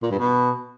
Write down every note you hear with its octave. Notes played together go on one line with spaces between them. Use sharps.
A#2
G2
B2